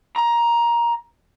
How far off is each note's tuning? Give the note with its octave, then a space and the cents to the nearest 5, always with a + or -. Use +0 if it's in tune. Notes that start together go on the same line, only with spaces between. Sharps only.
A#5 +15